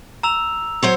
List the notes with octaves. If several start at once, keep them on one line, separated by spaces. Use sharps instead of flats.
A#5 E6 F7
F#3 C5 C#5